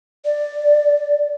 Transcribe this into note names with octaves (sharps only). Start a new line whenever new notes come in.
D5